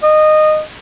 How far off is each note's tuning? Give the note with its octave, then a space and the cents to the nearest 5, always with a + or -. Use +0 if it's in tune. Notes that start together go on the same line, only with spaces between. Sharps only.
D#5 -15